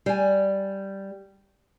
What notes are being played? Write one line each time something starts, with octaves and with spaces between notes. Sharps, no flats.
G3 G#5